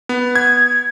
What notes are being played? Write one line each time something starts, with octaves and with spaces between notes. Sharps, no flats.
B3
G#6